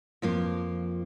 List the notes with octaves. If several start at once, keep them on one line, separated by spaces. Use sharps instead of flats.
F2 F3 A#3